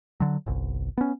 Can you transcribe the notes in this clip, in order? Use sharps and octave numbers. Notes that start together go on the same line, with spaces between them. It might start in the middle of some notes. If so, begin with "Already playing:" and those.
D3 F#3
G1 C2
B3 C#4